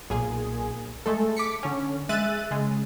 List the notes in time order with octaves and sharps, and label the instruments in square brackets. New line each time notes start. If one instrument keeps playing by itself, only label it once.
[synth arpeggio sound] B1 A#2 G#4
G#3 A3 A4
D6 B6 C#7
D3 C#4
G#3 E5 F#6 A6 D#7
C#3 G#3